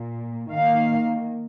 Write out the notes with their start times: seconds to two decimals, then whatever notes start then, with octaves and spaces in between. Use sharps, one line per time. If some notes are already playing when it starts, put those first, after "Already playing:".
Already playing: A#2 A#3
0.53 D#3 A#3 F5